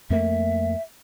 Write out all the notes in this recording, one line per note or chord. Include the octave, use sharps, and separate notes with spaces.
F2 A3 A#3 E5